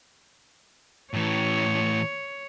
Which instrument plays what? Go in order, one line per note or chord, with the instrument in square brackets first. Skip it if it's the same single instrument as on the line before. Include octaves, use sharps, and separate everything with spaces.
[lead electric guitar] A2 E3 [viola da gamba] C#5